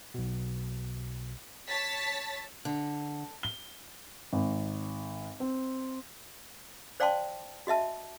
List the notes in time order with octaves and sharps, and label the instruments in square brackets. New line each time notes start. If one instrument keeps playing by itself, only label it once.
[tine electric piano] B1 B2
[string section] C#5 A5 A6 B6
[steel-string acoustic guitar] D3
[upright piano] G7
G#1
C4
[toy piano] C5 D5 F5 G5 A5 C6
F#4 D#5 E5 A5